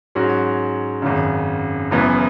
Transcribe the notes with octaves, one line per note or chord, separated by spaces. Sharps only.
G#2 F#3 C#4 F#4
G#1 F#2 C#3
F#1 F#2 E3 B3